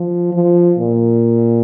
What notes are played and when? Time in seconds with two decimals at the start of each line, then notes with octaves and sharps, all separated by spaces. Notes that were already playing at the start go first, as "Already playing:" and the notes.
Already playing: F3
0.33 F3
0.79 A#2